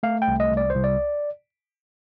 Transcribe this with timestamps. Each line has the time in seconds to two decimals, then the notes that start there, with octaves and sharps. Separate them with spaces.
0.03 A3 F5
0.22 G5
0.28 C2
0.40 D#5
0.52 C2
0.57 D5
0.70 C5
0.75 C2
0.84 D5